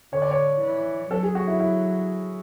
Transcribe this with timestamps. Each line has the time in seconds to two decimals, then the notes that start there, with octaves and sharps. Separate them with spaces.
0.13 D3 C#5
0.22 D5
0.31 C#5
0.62 E3
1.10 F#3 A4
1.23 G#4
1.35 F#4
1.47 E4
1.60 E4